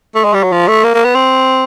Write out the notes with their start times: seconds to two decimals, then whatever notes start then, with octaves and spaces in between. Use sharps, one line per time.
0.15 A3
0.24 G#3
0.34 G3
0.43 F#3
0.52 F3
0.68 A3
0.84 A#3
0.94 A#3
1.05 B3
1.15 C4